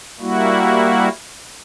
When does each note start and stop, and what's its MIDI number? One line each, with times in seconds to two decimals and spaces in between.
0.20 1.09 55
0.20 1.09 58
0.20 1.09 64
0.20 1.09 66